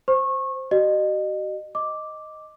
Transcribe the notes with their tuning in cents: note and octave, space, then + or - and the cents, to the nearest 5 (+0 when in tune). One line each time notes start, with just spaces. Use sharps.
C5 +0 C#6 -25
F#4 +45 D#5 -30
D#5 +0 D6 +0